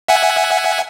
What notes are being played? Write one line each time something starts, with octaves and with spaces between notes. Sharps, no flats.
E5 F#5 G#5